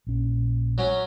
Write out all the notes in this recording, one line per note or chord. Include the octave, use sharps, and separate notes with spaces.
A#1 C#4
F#3 C#4